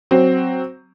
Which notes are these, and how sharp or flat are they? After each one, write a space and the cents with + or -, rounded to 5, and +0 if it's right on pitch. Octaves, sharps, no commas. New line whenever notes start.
F#3 +5 C4 +0